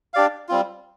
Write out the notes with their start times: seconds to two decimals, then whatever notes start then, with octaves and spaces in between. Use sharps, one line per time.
0.14 D4 G4 D5 F5
0.49 G3 C4 F4